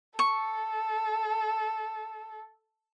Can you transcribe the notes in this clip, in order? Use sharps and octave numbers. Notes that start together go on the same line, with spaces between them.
A4 C#6